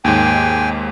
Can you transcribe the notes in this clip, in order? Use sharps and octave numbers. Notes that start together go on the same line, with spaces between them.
D#2 G#2 G5 G#5